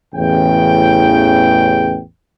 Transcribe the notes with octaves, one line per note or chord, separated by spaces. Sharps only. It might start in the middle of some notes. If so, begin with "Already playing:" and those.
A1 E2 C#3 G5